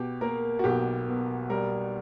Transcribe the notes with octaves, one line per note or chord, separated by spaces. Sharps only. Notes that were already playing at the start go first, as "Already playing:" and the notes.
Already playing: B2 G4
A#3 A#4
F#4
B1 G4
B2
G3 A#4